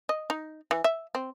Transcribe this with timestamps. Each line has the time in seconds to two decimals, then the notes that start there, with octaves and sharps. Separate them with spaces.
0.09 D#5
0.30 D#4
0.71 E3
0.84 E5
1.15 C4